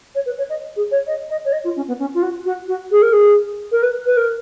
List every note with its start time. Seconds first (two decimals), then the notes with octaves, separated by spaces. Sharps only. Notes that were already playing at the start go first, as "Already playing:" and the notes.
0.15 C#5
0.26 B4
0.38 C#5
0.49 D#5
0.76 G#4
0.91 C#5
1.06 D#5
1.29 D#5
1.45 C#5
1.52 D#5
1.64 F4
1.76 C#4
1.87 B3
1.99 C#4
2.14 F4
2.22 F#4
2.45 F#4
2.68 F#4
2.91 G#4
3.02 A#4
3.12 G#4
3.72 A#4
3.83 B4
4.06 B4
4.17 A#4